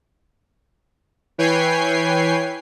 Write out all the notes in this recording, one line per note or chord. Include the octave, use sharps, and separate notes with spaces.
E3 B4 C#5 G5 G#5 C7